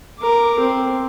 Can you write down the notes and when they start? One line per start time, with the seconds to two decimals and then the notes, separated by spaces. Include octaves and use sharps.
0.19 A#4 D6
0.59 C4